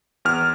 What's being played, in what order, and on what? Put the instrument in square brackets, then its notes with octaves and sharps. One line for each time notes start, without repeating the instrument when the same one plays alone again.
[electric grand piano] E2 F6